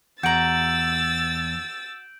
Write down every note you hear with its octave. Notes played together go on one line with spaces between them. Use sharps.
E2 F#4 A#5 E6 G6 A6 D7 F#7